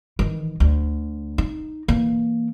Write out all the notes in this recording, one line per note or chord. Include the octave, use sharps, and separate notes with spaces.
D#3 E3
D2
D#4
E3 A#3